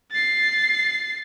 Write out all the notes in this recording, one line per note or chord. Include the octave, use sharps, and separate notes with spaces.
A6 C7